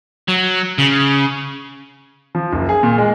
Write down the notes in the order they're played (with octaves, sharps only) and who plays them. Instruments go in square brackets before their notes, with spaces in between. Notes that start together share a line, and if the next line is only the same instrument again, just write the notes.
[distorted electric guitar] F#3
C#3
[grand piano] F3
F#1
G#4
A#2
G#3